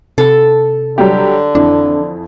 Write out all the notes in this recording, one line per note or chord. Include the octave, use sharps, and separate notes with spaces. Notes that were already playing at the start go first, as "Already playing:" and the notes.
C3 A4
D3 F#3 G3 G4
F2 E3 D4